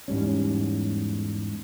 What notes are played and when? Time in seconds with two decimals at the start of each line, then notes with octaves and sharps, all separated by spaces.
0.08 E2 G#2 G3 C#4